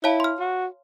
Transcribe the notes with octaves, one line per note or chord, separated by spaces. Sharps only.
E4 C#5 F5 A5
C6 F6
F#4